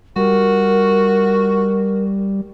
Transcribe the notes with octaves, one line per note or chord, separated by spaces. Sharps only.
G3 F#4 A#4